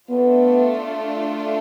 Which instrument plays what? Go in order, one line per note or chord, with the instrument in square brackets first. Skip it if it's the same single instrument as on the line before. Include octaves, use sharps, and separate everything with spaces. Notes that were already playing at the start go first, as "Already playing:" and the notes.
[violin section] A3 D4 F4 [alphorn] B3